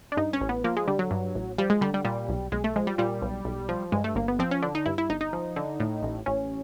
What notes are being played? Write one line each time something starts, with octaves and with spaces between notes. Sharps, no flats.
D4
G2 D#4
C#4
A1
B3
F3 A#3
G#3
D3 G3
F#3
G2
A1
F3 G3
G#3
D3 G3
G3
A#2 G3
B1
B1 G#3
A3
F3 G#3
G3
A#2 G3
B1
B1
F3
G2 G#3
A3
G1 A#3
B3
F3 C4
C#4
D3 D4
D#4
G2 E4
E4
G1 D#4
D#4
F3
D3
A2
A1
A1 C#4